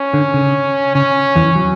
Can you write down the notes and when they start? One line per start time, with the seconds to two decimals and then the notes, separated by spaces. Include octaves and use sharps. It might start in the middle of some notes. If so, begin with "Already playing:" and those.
Already playing: C#4
0.14 D3
0.34 C#3
0.95 C#3 C#4
1.36 E2 E3
1.56 F#3